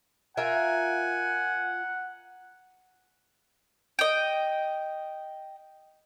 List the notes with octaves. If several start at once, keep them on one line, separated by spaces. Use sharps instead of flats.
F4 A#4 E5 F#5 G#5
D#5 G5